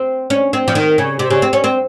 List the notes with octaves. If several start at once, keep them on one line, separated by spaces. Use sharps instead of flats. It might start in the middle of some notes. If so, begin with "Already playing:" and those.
Already playing: C4
C#4
C4
F3
D#3
C#3
C3
C#3
C4
C#4
C4